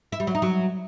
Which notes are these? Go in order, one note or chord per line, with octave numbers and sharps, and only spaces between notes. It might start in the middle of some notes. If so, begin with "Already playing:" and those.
E4
G3
F#3
D#4
F#3